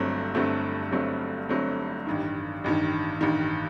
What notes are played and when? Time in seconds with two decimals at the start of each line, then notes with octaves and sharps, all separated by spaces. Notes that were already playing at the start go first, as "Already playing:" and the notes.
Already playing: G1 G2 F#3 A3 C4
0.35 G1 G2 F#3 A3 C4
0.92 G1 G2 F#3 A3 C4
1.49 G1 G2 F#3 A3 C4
2.07 A1 G2 D#3
2.64 A1 G2 D#3
3.21 A1 G2 D#3